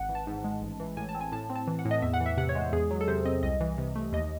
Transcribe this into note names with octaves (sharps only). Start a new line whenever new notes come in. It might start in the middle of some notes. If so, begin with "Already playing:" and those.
Already playing: G#1 F#5
E3
A5
G#2
G#3
A1
E3
A2 G#5
A5
C4
G#5
A2 A5
C4
A5
E3
F#5
A2
D#5
E2 E5
F#5
E3
E5
C3 F#5
C#5
G#3
C5
E2 G#4
F#3
A4
C3 C5
C4 D#5
C2 D#5
E3
C3
A3
D#2 D#5